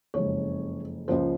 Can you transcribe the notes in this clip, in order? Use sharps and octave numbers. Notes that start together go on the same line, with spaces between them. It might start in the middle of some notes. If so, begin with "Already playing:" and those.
F#1 F2 C#3 G#3 C#5
C#2 C#3 F3 A#3 C5